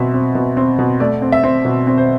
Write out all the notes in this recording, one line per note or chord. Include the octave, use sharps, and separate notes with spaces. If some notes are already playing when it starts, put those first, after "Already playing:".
Already playing: B2 C4 E5
C4
B2
C4
B2
A3 D5
C4
E5
C4
B2
C4
C5